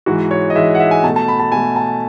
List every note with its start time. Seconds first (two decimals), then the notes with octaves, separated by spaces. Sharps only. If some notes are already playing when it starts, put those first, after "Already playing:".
0.06 G#2 E3 G#3 F#4
0.31 C#5
0.50 D#5
0.55 G#2 E3 G#3 E5
0.75 F#5
0.80 E5
0.91 G#5
1.03 B2 A5
1.08 A3
1.16 A5
1.28 B5
1.40 A5
1.52 B2 A3 G#5
1.76 A5